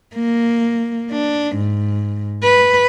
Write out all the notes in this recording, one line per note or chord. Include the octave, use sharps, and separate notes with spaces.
A#3
D4
G#2
B4